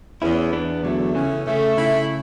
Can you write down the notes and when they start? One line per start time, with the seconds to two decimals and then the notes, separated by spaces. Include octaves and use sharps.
0.22 E2 C#4 E4
0.53 E2 B3 D4
0.84 D3 F#3 A3
1.15 C#3 E3 C#4
1.46 C#3 A3
1.77 C#3 E4